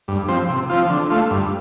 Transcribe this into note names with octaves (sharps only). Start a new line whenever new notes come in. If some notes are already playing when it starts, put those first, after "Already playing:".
G2
F3 C4
C3
F3 C4 F4
D3
A3 F4
G2